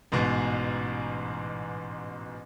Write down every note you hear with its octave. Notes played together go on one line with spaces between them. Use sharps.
A1 G#2 B2